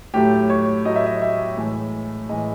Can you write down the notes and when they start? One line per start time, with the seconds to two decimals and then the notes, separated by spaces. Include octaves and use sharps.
0.14 A2 F#3 A3 G4
0.50 C#5
0.85 A2 F#3 A3 D#5
0.96 E5
1.06 D#5
1.22 E5
1.57 A2 E3 G#3
2.29 A2 E3 G#3 D#5